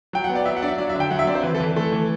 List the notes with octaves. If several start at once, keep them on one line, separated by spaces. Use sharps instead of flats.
F#3 G5
F#5
B3
D5
F#3 E5
F#5
D4 D5
E5
F#3 D5
E5
D3 G5
F#3 F#5
E5
C4 D5
C5
E3 B4
A4
E3
A3 A4
E3